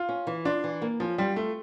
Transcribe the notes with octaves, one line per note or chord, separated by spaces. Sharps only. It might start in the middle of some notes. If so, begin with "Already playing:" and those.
Already playing: F4
C#4
E3
D4 F4
E3
A#3
F3 C#4
G3 F4
A3 F4